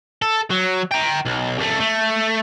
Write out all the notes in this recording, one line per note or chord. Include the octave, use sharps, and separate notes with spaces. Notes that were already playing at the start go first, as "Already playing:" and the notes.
A4
F#3
G5 A#5
B1
C2 A3
A3